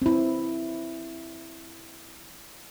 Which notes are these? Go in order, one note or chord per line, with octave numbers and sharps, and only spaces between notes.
C4 E4